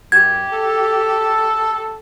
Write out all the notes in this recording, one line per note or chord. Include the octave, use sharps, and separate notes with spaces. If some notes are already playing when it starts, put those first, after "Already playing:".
F#2 G4 G#6
A4